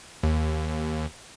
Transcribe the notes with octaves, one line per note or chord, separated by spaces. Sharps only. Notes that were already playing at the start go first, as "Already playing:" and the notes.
D#2